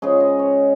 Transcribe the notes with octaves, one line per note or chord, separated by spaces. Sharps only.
C#3 G#3 C#4 G#4
D#5
C#5